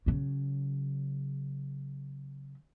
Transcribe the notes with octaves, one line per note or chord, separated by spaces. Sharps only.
C#3 F#3